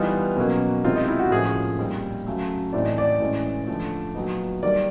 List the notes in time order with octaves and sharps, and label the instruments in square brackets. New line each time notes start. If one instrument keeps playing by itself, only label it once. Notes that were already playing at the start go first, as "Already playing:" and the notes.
Already playing: [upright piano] E3 G3 B3 D#4 F4
B2 F#3 A#3 C#4
C3 D#3 G#3 C4 F4
D#4
E4
F#4
A2 F3 A#3 C#4 G#4
A#2 G3 C4 D#4
C#3 F#3 A3
A2 E3 A3 C4 D#4 D5
D#5
D5
A2 E3 G#3 C#4
D3 F3 A3
A#2 F#3 B3 D#4
D#3 G3 A#3 D5